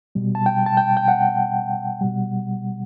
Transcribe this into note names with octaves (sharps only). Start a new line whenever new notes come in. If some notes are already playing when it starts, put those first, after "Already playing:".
B2 G3
A5
G5
A5
G5
G5
F#5
B2 G3